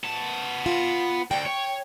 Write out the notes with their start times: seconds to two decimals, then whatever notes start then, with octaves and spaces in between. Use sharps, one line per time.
0.04 B3 A5
0.66 F4
1.31 D2 G5
1.46 C#5